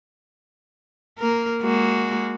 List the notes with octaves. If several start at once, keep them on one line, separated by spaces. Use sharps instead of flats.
A#3 A#4
G#3 A#3 F#4